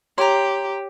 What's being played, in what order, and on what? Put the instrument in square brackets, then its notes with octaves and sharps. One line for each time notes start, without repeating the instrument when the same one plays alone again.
[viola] G4 [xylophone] C#5 [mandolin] A#5 C6